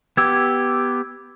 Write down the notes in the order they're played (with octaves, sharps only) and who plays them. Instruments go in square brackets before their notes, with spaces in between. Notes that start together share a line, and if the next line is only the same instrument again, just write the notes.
[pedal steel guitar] B3 G4 [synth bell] E6 G#6